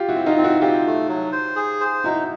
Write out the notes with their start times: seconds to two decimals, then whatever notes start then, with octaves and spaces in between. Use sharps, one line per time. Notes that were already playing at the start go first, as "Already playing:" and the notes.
Already playing: F4 G4
0.09 E4 F#4
0.15 C4
0.26 D#4 F4
0.38 C4
0.44 E4 F#4
0.62 C4 F4 G4
0.86 A3
1.09 F#3
1.32 C5
1.56 G#4
1.80 C5
2.04 D#4 E4 F#4